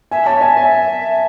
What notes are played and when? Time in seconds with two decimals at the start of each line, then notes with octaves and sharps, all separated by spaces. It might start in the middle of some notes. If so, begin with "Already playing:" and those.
0.11 E5 G#5
0.26 C#5 A5
0.41 E5 G#5
0.57 G#5